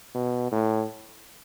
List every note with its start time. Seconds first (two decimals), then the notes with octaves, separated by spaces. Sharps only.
0.15 B2
0.52 A2